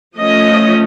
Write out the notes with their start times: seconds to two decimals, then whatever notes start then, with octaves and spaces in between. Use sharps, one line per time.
0.17 F3 A3 C#4 D#5